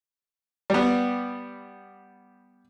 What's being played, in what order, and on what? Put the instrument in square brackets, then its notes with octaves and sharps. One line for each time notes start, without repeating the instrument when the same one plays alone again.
[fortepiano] G3 B3